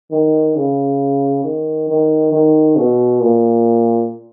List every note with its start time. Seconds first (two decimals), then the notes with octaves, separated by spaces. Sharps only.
0.12 D#3
0.56 C#3
1.43 D#3
1.89 D#3
2.32 D#3
2.76 B2
3.20 A#2